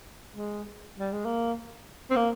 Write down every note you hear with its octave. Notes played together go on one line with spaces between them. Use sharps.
G#3
G3
G#3
A#3
C4
A#3